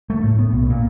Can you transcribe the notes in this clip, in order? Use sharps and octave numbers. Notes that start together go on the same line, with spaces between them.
A3
A2
B3
B1
A#2